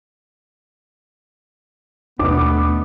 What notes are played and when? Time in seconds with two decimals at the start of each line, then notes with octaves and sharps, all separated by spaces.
2.19 D#2 B2 A3 B3 D4 D6